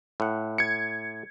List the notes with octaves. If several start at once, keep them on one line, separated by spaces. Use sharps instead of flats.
A2 F#5
G#6 C#7